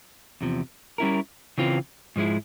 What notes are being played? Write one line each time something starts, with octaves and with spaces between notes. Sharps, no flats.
E2 C3 F3
G3 C#4 E4 A#4
C#3 E3 C4 F4
G#2 F3 G#3 E4